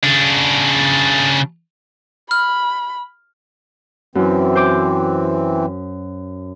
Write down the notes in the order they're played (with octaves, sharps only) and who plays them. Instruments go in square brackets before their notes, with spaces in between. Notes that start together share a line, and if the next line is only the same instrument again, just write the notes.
[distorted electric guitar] C#3 D4
[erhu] B5 [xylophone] F6
[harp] F#2 [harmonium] E3 C4
[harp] C5 D6